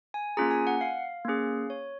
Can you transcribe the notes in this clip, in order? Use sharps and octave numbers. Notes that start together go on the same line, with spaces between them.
G#5
A#3 C#4 F4 G#4 A#5
G#5
F#5
F5
A#3 C#4 G#4
C#5